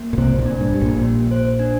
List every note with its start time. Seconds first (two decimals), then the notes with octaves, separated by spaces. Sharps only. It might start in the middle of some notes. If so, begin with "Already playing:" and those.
Already playing: A#3
0.13 A#2
0.18 C2 C3 C5
0.38 A#1 A#2
0.46 D4
0.61 G2
0.74 G4
0.81 A#1 A#2
1.03 A#3
1.31 C5
1.60 D4